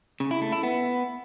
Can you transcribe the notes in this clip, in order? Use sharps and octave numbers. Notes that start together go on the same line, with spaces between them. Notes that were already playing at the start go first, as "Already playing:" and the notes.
C#3
E4
A3
E4
B3